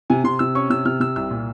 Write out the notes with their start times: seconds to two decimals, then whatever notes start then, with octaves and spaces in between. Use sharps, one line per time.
0.10 C3 G#5
0.24 C3 C6
0.39 C3 E6
0.55 C#4 C#6
0.70 C3 E6
0.85 C3 F6
1.00 C3 E6
1.16 C2 E6
1.31 A#2